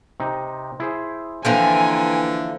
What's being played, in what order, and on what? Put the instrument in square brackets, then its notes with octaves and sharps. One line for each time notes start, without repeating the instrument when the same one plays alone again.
[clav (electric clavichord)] C3 D#4
E4 G#4 C5
[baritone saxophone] D3 [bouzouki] E3 F3 A#3 [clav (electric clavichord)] C4 [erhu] G#5